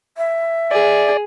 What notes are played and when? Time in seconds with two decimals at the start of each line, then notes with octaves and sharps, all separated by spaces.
0.17 E5
0.71 G#4 D5